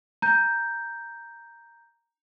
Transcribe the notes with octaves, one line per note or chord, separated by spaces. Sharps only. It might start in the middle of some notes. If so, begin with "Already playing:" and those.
A#5 G6